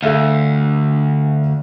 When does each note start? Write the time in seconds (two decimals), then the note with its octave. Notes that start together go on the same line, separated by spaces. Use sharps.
0.03 D2 A4 E5 F5